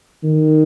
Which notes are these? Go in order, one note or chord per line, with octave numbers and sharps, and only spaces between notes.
D#3